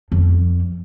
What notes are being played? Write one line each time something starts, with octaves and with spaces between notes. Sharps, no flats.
F2